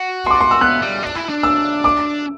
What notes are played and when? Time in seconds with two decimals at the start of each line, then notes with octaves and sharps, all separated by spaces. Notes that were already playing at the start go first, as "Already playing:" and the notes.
Already playing: F#4
0.26 C6
0.31 D6
0.41 C6
0.51 E6
0.61 B3 F#6
0.82 G3
1.03 D4
1.16 E4
1.29 D4
1.43 E6
1.84 D6